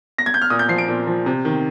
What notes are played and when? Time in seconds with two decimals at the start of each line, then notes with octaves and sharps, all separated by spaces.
0.18 A#6
0.26 G#6
0.34 G6
0.42 F6
0.50 A#2 D#6
0.59 G6
0.68 F3 C7
0.78 D7
0.88 A#2
1.07 F3
1.26 C3
1.45 D#3